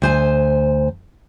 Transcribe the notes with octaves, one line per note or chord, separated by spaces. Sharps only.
D2 C5 G#5